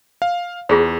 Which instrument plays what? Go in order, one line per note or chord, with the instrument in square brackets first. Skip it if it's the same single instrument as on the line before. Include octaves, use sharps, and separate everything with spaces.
[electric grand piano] F5
[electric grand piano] E2 [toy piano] F4 G#4 C5